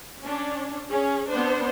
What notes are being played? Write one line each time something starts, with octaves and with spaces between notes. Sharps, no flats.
C#4 D4
C#4 G#4
B3 C4 D4 C5